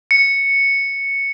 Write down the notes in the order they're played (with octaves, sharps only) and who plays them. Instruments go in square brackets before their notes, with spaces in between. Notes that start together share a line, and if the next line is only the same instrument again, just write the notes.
[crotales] C#7